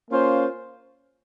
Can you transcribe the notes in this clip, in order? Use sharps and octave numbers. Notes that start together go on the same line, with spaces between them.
A#3 C#4 F4 C5